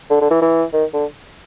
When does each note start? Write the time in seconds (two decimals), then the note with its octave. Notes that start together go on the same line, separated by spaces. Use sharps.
0.10 D3
0.21 D3
0.30 E3
0.41 E3
0.73 D#3
0.93 D3